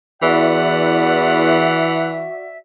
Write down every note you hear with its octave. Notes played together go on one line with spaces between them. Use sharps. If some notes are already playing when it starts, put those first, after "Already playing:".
E2 E3 F#4 D5 E5 F#5